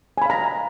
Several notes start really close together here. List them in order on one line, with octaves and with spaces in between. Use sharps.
G#5 B5 F5 A#5